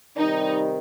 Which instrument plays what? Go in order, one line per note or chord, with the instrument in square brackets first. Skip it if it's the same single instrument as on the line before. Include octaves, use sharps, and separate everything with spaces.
[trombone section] C3 D#3 G3 [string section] D#4